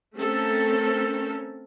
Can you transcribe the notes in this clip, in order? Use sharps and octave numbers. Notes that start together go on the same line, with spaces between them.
A3 C4 C#4 A4 A#4